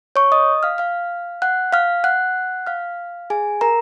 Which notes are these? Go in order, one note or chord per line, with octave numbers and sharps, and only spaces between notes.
C#5 C#6
D#5 D#6
F5 F6
F5 F6
F#5 F#6
F5 F6
F#5 F#6
F5 F6
G#4 G#5
A#4 A#5